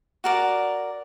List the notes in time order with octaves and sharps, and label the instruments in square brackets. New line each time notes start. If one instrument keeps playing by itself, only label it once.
[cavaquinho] F#4 A#4 D5